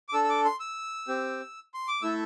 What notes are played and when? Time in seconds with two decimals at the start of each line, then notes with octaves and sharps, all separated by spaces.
0.09 D6
0.13 D4 A4 E6
0.24 E6
0.29 D6
0.45 C6
0.60 E6
1.08 C4 G4
1.74 C6
1.88 D6
2.02 A3 E4 A4 E6